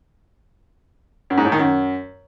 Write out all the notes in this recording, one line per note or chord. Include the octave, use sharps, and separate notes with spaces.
F#2
G#2
A2
D#3
F#2